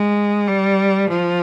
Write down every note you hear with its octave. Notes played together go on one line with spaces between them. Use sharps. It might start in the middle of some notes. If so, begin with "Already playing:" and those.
Already playing: G#3
G3
F3